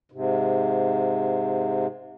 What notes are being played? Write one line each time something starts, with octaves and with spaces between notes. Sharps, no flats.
G#2 C3